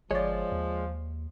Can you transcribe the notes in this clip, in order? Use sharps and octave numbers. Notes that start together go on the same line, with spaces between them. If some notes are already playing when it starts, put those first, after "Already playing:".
G1 F3 G#3 C#5 D5
D#2